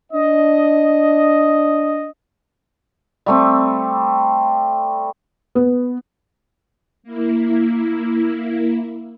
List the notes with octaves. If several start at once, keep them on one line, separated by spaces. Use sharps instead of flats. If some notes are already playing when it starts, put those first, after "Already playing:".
D4 D#5
G3 A3 C4
B3
A#3 E4